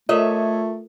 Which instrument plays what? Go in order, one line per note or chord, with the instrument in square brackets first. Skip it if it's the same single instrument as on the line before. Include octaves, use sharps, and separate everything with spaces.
[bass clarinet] A3 [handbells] F4 A4 A#4 [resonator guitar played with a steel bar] C#5 D#5 E5